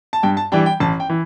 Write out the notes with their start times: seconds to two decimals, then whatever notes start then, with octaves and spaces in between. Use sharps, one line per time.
0.13 A5
0.23 G2 G5
0.37 A5
0.52 E3 G3 D4 G5
0.66 G5
0.80 A1 A5
1.00 G5
1.09 E3